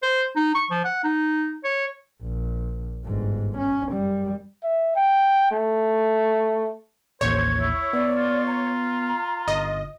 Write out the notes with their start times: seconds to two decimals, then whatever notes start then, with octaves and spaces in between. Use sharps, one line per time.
0.02 C5
0.36 D#4
0.55 C#6
0.70 F3
0.84 F#5
1.04 D#4
1.64 C#5
2.23 A#1
3.05 G1 G#2
3.58 C#4
3.93 F#2 G3
4.64 E5
4.96 G5
5.51 A3
7.21 A1 D#2 C5 C#5 G#6
7.60 E4
7.93 B3 D5
8.15 F4
8.47 A#5
9.48 G1 D#5